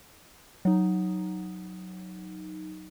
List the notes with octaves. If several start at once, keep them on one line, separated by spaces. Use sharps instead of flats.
F#3 D#4